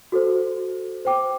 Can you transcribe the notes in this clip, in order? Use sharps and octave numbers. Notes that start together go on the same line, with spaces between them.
F#4 A4 C5
C5 G5 D6